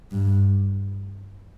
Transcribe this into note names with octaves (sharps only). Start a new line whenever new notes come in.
G2